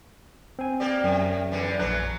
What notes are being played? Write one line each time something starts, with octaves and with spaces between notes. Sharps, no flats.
C4 G#5
A#3 G4 D5
F#2 C3
E2 D3 E3
A#1 E3 F#3 A#5 F#6